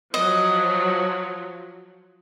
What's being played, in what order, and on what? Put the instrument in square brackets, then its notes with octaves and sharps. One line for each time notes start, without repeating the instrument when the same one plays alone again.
[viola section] F3 F#3 [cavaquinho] D#5